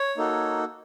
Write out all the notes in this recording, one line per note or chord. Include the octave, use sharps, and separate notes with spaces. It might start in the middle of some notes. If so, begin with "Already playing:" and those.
Already playing: C#5
A#3 D#4 F#4 A4